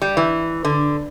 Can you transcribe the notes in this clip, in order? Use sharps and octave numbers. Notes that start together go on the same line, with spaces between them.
G3
E3
D3